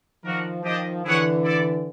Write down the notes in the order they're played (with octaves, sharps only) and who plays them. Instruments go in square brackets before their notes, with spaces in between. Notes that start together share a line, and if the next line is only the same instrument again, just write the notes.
[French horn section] D#3 F3 [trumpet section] D4 F#4 A#4
[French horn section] D#3 F3 [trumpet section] D4 G4 C5 D#5
[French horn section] D3 E3 [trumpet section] E4 G#4 C#5 F#5
[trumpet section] E4 A4 D5